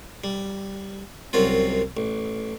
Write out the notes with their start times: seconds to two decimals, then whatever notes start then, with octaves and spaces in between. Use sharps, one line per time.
0.24 G3
1.33 C2 F#2 F#3 C4 F4
1.97 A1